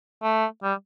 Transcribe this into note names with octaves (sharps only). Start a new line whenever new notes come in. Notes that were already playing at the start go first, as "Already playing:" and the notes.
A3
G3